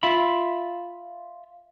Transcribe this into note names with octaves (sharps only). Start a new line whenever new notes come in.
F4 E5 B5